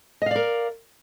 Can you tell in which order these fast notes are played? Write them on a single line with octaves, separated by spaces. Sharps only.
D#5 F5 D5 A#4